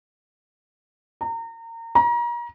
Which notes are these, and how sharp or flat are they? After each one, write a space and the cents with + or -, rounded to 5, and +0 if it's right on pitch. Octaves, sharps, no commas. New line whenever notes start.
A#5 -30
A#5 +35